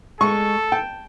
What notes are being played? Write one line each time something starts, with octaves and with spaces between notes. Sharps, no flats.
G#3 A4 C#6
G5 A5